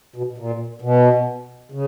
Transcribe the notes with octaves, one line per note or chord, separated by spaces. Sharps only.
B2
A#2
B2
C#3